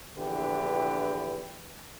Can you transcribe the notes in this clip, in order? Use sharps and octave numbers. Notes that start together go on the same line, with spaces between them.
A#1 E2 D3 E3 G4 B4